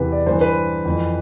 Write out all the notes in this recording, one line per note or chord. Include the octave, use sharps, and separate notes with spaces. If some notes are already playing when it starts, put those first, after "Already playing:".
Already playing: E2 C3 E3 B4
D5
G2 E3 C5
B4
F2 E3